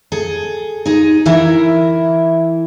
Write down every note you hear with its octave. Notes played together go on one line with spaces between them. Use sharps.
G#4 A4
D#4 G#4
E3 E4 A#4 E5